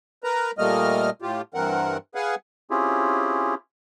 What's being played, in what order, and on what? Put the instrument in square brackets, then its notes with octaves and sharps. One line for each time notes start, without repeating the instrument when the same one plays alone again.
[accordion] A#4 B4 A#5
A#2 G3 A3 A#3 D#5 F6
A2 F4 G4
G2 E3 C4 A#4 F#5
G#4 B4 F5 F#5 G#5
[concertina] C4 C#4 E4 F4 G4 G#4